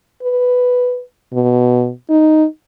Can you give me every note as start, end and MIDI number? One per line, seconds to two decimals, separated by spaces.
0.23 1.01 71
1.34 1.90 47
2.10 2.45 63